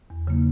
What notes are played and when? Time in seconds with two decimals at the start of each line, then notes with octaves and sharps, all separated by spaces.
0.10 E2
0.27 C#3 F#3 A#3 D#4